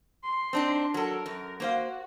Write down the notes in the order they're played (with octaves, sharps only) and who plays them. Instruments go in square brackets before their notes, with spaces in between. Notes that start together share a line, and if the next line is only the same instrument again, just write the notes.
[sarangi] C6
[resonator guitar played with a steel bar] C4 D4 D#4
[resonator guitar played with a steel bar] F#3 A4 [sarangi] A#4
[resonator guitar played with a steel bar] F#2
[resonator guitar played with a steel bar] A#3 C5 F5 [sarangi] F#4